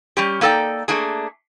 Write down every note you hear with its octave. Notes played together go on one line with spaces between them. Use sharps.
G3 C#4 G4
A#3 D#4 A4 D5 G5
A3 A#3 D4 G#4